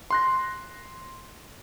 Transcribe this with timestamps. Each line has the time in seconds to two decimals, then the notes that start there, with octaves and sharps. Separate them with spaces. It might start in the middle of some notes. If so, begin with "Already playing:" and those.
0.11 C6 F#6 A#6